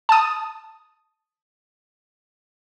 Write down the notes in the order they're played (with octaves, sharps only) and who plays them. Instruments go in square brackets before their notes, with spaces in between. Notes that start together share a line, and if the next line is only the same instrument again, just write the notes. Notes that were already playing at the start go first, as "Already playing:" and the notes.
[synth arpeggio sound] A5 D#6